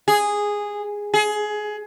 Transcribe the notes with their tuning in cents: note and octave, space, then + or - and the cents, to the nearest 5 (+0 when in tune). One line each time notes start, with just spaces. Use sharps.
G#4 -10
G#4 +20